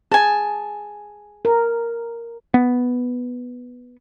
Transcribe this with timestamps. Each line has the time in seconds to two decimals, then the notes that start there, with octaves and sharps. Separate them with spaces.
0.12 G#4 G#5 A5
1.45 A#4
2.54 B3